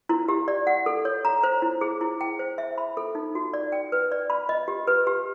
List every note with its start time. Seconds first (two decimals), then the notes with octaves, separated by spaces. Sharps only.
0.09 E4
0.28 G4
0.48 D5
0.67 F#5
0.86 A4
1.05 C#5
1.25 A#5
1.43 C5
1.62 E4
1.81 G#4
2.01 E4
2.21 G5
2.39 C5
2.58 E5
2.78 B5
2.97 A4
3.15 D#4
3.35 F#4
3.53 D5
3.72 G5
3.92 B4
4.12 D5
4.30 B5
4.49 D#5
4.68 G4
4.87 B4
5.07 G4